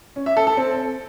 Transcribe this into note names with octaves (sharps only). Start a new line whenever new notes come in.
C#4
E5
A4
A4
C4